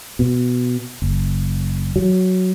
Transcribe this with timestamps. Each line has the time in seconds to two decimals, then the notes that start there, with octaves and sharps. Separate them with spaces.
0.19 B2
1.02 F#1
1.96 F#3